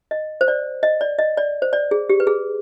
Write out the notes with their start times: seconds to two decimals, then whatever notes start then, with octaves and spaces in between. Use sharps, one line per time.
0.11 D#5
0.41 C5
0.48 D5
0.83 D#5
1.01 D5
1.19 D#5
1.37 D5
1.62 C5
1.73 D5
1.91 G#4
2.09 G4
2.20 B4
2.27 G#4